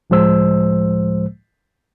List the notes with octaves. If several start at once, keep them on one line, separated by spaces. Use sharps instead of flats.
C#2 A2 F3 G#3 C5 E6